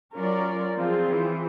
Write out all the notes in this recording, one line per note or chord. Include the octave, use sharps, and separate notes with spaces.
F#3 C#4 F4 A#4 D5
F3 C4 F4 G#4
E3